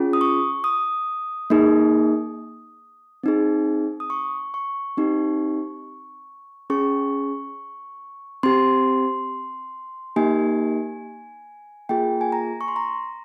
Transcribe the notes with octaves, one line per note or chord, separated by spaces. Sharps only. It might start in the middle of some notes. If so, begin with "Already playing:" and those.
Already playing: C#4 F4 G#4
D#6
C#6
D#6
A#3 D#4 G#4
C4 D#4 G#4
D#6
C#6
C#6
C4 D#4 G4
C#4 G#4 C#6
C4 G4 C6
A#3 D#4 G4 G#5
A#3 F4 G#4 G5
G#5
A#5
C#6
C6
A#5